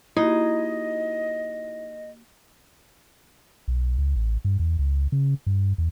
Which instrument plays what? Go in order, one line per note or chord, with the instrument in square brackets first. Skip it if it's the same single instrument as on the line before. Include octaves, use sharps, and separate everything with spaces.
[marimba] A#3 F#4 G4 [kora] D#4 [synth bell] E4 [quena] D#5
[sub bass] B1
C#2
A1
G2
E2
C#2
C#3
G2
E2